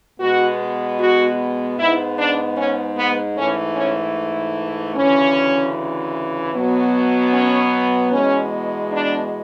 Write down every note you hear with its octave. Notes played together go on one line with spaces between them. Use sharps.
B2 G#3 B3 F#4
F#4
G#2 G#3 B3 E4
D4
C#4
B3
G#2 E3 A3 C#4
C#4
D2 C#3 E3 C#4
B2 F#3 B3
C#4
E2 B2 G#3 C#4
D4